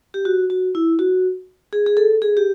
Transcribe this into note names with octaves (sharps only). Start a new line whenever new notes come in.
G4
F#4
F#4
E4
F#4
G#4
G#4
A4
G#4
G4